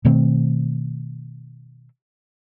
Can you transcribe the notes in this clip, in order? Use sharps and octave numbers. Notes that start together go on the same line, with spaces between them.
B2 D#3 A3 C4